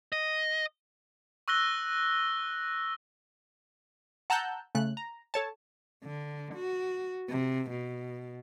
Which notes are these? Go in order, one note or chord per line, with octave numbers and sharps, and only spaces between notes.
D#5
C#6 E6 F#6 A#6 G7
F#5 A5 A#5 E6 F#6 G6
C#3 A3 F#6
A#5
A4 C#5 A5
D3
F#4
C3
B2